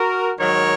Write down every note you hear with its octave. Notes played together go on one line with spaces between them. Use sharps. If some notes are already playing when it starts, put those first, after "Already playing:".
Already playing: F#4 A#4
G#2 D#3 F#3 A#4 C#5